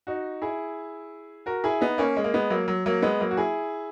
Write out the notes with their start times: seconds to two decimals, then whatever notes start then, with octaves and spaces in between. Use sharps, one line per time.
0.07 D#4 F#4
0.42 E4 G#4
1.46 F#4 A#4
1.64 E4 G#4
1.81 B3 D#4
1.98 A#3 C#4
2.16 G#3
2.24 A#3
2.34 G#3 B3
2.50 F#3 A#3
2.68 F#3
2.86 F#3 A#3
3.02 G#3 B3
3.20 F#3 A#3
3.31 F#4
3.37 E4 G#4